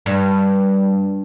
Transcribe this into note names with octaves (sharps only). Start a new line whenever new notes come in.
G2